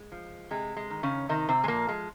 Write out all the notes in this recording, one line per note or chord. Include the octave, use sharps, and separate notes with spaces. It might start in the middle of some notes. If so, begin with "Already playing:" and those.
Already playing: G#3
F3
C3 G#3
G#3
D#3
C#3 C#4
C3 D#3 D#4
C3 C4
G#3
A#2 F3 A#3
G#3